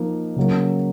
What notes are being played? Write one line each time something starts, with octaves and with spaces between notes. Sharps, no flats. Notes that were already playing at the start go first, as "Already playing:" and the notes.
Already playing: F3 A#3 D#4
C#3 F#3 A#3